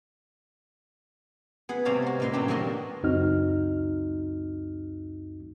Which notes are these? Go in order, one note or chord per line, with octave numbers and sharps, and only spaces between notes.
B3 G#4 F#5
C3 G3 C#5 F5 A5 A#5
G#3 F#4
F#2 A#2 A#3 B4 C6
A2 C3 F#3 D4 G4
F2 G3 A#3 E4 F#4 D#5
C#2 F#2 C4 D#4 F#4 F6